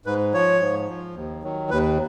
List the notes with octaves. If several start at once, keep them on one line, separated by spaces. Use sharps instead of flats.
G#2 B4
F3 C#5
G#2
F3
D#2
D#3 F#3
D#2 B4